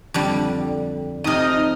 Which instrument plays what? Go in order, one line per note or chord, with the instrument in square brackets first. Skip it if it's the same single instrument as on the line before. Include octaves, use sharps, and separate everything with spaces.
[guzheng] F2 D3 G3
[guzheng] F2 C3 [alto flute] D#4 [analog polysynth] D#5 D#6 F6